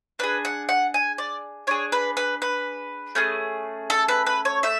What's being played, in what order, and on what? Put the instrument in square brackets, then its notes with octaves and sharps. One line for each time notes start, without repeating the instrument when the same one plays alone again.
[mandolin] D4 G#4 B4
F#5
F#5
G#5
D5
D4 G#4 C#5
B4
B4
B4
A3 C#4 G#4
A4
B4
B4
C#5
A3 E5